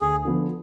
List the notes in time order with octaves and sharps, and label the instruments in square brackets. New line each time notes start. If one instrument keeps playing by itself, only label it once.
[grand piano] D2 [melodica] G#4
[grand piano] D3 F3 B3